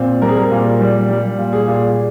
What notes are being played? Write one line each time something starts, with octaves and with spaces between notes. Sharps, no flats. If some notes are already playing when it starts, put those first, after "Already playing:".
Already playing: A#2 C4
G3 A#4
G#4
A#4
A#2
G3
G3
A#2
G#4
A#2